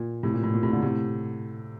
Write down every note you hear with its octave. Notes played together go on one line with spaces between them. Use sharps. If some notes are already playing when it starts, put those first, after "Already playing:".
Already playing: A#2
A2 C3
A#2
A2
A#2
A2 C3
A#2 D3
A2 C3